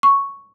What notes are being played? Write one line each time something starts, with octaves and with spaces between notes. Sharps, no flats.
C#6